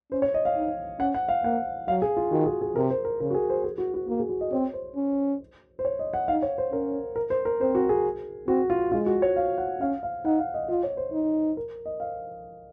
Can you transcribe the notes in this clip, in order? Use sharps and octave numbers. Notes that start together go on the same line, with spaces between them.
C#4 C5
C#5
D#5
F5
D#4
C#4 F#5
F#5
F5
A#3 F#5
F#3 F5
G#4
F4
D#3 F#4
G#4
G#4
C3 A#4
C5
A#4
C#3 A#4
F#4
G#4
C5
G#4
F#4
F#4
A#3 F#4
G#4
F#4
D#5
C4 C#5
C5
C#4
C5
C#5
D#5
F#5
D#4 F5
C#5
C5
C#4 A#4
A#4
C5
A#4
C4 C5
F#4
G#4
C4 F#4
F4
G#3 F4
F#4
C#5
F5
F#5
C#4 F5
F5
D#4 F#5
F5
D#5
F4 D#5
C#5
C5
D#4
A#4
D#5
F5